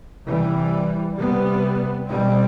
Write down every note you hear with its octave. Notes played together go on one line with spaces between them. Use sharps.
C3 E3 G3
C3 G3 B3
B2 G3 C4